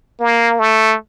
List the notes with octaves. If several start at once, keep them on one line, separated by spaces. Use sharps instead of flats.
A#3
A3